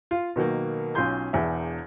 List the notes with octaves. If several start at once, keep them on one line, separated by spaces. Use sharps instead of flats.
F4
B2 D#3 F#3 A#3
B1 C#4 F4 C6 G6
E1 E2 E5